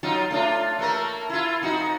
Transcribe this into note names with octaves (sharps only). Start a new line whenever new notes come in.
F#3 D#4 F4
A3 D4 F4
A3 A#3 A#4
E4 F4
F2 D#4 F#4